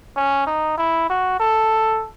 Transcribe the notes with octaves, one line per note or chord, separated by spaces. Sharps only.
C#4
D#4
E4
F#4
A4